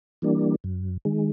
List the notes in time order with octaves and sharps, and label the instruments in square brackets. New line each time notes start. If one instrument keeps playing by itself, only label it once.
[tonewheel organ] E3 G3 A#3 D4
F#2
D#3 G#3